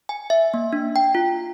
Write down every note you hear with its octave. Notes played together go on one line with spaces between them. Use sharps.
G#5
E5
A#3
D4
G5
F4